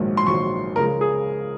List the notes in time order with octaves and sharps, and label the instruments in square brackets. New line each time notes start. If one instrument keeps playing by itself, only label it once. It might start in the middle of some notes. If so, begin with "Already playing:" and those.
Already playing: [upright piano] A#1 G#2 D#3 F#3 A#3
C6
A#1 G#2 D#3 F#3 A#3 C#6
C#2 C#3 F3 G#3 A#4
G#4